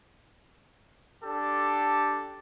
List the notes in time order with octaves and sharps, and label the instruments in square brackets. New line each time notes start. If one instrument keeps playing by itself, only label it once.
[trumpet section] D4 G4 A4